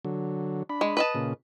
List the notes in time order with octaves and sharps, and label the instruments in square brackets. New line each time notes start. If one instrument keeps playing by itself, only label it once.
[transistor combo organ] D3 F#3
D4 B5
[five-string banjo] G#3
B4 D#5 A5
[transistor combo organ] A#2 C#3